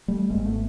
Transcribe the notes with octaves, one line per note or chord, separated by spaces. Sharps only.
G3 A3
G#1 G#2 G#3 A#3
A3 B3